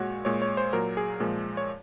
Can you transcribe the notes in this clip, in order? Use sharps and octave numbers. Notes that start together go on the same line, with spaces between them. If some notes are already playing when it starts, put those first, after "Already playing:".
Already playing: A#2 G#3 F#4 C#5
A#2 G#3 C#5
C#5
C5
A#2 F#3 A#4
G#4
A#2 F3 G#3
C#5